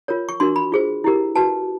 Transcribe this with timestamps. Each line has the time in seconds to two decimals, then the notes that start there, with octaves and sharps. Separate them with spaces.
0.08 F4 A#4 C#5
0.29 C#6
0.40 D4 F#4 A#4 C6
0.56 B5
0.72 F4 G#4 C5
1.04 E4 G4 A#4
1.35 F#4 B4 A5